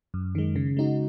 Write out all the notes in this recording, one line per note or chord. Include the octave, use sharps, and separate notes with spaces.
F#2
D#3 G#3
C#3
G#3 D#4 F#4